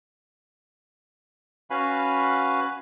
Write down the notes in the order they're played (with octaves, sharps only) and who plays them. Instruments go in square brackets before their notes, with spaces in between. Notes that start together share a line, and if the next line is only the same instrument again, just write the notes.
[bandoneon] C#4 F#4 B4 F5 G#5 B5